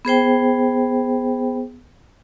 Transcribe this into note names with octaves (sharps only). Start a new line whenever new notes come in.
B3 G#4 C5 G5